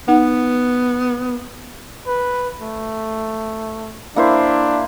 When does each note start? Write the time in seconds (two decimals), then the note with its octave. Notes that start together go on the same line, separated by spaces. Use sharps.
0.08 B3 D#4 F#5
2.07 B4
2.61 A3
4.16 A#3 D4 E4 C5